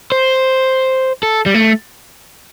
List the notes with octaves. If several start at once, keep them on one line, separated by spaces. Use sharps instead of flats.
C5
A4
G3
A3